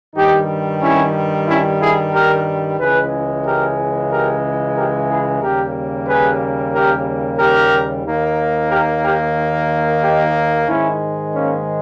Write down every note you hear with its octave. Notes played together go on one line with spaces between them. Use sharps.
G2 D#3 G3 D#4 G4
C#4 E4
C#4 E4
E4 G#4
G4 A#4
C#2 C#3 E3 G#3 G#4 B4
G4 A#4
G4 A#4
G4 A#4
E4 G#4
D#2 C#3 G3 A#3 G4 A#4
G#4 B4
G4 A#4
G4 A#4
D#2 D#3 A#3
G4 A#4
G4 A#4
D#4 G4
G#2 D#3 G#3 C#4 E4
A#3 C#4